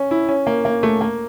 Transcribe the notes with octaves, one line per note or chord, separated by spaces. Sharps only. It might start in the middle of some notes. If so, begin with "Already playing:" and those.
Already playing: C#4
E4
C#4
A#3
A#3
A3
A#3